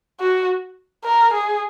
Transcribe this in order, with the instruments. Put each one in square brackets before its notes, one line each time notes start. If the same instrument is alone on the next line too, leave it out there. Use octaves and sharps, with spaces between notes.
[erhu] F#4
A#4
G#4